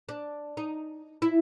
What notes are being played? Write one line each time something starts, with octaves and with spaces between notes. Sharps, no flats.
D4
D#4
E4